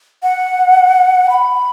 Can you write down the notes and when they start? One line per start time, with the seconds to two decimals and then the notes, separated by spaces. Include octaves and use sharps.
0.23 F#5
1.30 B5